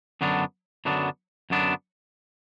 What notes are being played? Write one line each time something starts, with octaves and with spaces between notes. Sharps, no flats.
F#2 D3 F#3 B3 D4
F#2 D3 F#3 B3 D4
F#2 D3 F#3 B3 D4